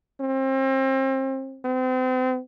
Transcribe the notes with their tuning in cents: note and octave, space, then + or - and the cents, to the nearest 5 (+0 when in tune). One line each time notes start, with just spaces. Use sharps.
C4 +35
C4 -35